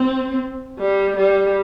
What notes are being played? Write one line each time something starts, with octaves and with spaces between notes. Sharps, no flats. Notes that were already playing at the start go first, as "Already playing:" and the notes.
Already playing: C4
G3
G3